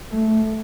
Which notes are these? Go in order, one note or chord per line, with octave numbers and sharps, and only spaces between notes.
A3